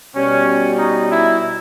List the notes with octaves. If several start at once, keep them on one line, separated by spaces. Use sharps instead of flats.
B2 G3 C#4
D#4
E4